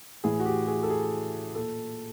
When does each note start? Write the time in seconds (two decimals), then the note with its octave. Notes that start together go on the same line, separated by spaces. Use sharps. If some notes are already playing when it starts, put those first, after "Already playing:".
0.24 A2 E3 G#4
0.40 F#4
0.45 G4
0.68 G#4
0.83 A4
0.90 G#4
1.55 A#2 A4